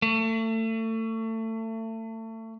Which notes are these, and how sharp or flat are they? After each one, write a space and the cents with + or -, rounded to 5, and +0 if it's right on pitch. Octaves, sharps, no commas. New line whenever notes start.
A3 +30